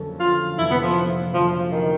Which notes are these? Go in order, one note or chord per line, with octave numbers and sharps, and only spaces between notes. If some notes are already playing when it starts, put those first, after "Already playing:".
Already playing: F2 D3 F#3 A#3 C#4
F4
F2 C3 E3 G3 A#3 E4
B3
F3
F2 D3 F3 F#3 A3 C#4
D#3